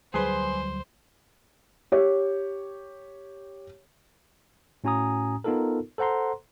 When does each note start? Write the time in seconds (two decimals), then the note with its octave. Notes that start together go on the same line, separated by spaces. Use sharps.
0.14 D2 F#3 G3 G#4 B4 C5 C6
1.92 G4 C#5
4.84 A2 C#4 F#4 G#5 A#5 D#6
5.44 B3 D#4 F4 A4 A#4
5.98 A4 C5 F#5 A#5 C6